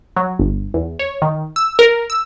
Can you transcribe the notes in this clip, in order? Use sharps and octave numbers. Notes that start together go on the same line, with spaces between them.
F#3
G1
E2
C#5
D#3
E6
A#4
E6